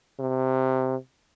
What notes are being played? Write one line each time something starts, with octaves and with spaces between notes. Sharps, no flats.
C3